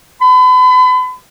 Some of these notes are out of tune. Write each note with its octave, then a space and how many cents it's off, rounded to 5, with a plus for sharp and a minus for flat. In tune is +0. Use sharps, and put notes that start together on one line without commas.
B5 +40